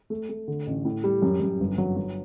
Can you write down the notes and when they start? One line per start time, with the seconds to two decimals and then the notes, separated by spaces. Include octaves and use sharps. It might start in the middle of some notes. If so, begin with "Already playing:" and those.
0.10 A3
0.29 A3
0.48 D3
0.67 A1
0.85 A2
1.04 G3
1.22 F#2
1.40 F#2
1.60 G1
1.78 F#3
1.97 F#3